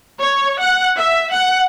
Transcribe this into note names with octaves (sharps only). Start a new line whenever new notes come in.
C#5
F#5
E5
F#5